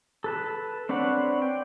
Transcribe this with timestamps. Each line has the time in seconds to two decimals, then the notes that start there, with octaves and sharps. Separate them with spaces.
0.24 A4 B4 A5
0.89 C4 D4 B4 C#5 F#5
1.42 G5